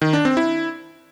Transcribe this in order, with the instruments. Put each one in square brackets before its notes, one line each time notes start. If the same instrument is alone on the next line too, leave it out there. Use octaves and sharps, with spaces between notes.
[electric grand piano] D#3
D4
C4
E4